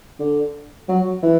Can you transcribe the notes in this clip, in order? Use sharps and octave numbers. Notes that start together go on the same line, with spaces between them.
D3
F#3
E3